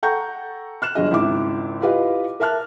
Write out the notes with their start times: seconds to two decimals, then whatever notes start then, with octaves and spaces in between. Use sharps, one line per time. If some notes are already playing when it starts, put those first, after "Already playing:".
0.03 A4 F#5 G5 A#5 C#6 G6
0.82 F6 F#6 E7
0.95 G1 G2 F#3 G#4 D#5
1.11 G#1 C#2 E4 E5 D6
1.82 E4 F4 G4 B4 D#5 F5
2.40 A#4 E5 A5 F6 F#6